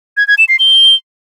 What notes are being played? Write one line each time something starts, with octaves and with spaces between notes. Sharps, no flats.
G#6
G#6
E7
C7
G7